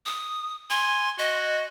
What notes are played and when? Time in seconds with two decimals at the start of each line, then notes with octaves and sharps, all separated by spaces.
0.06 D#6
0.70 G#5 C6
1.19 F#4 D#5